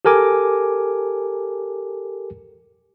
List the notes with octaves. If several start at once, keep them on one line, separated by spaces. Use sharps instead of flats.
G4 A4 A#4 G#5 D6